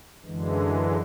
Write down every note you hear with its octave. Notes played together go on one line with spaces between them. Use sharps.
F#2 D3 E3 G#3